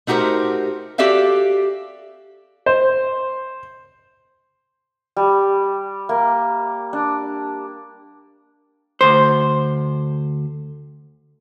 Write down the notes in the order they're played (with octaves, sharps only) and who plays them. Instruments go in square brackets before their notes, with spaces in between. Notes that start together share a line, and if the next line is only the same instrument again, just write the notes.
[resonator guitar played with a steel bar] A3 D#4 F#4 G4 A#4 C5
F#4 G4 A4 D5 E5 F5
[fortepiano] C5
[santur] G3
A#3
D4
[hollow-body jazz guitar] D2 C5